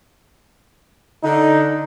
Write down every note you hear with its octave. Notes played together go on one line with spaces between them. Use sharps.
D3 D#4